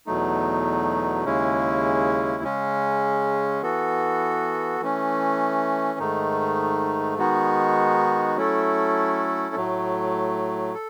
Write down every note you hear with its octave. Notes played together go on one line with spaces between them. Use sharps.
E2 B2 F#3 A3 D#4
D#2 C#3 G#3 C#4 E4
C#3 G#3 C#4
E3 B3 F#4 A4
E3 A3 C#4
G#2 D#3 A3 D#4
D#3 G#3 B3 D#4 F#4
F#3 A3 C#4 E4 A4
A2 F#3 A3
A4